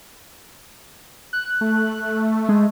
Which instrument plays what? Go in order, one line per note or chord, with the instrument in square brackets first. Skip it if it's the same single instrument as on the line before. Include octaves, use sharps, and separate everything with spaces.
[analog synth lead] F#6
[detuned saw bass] A3
[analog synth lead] G#3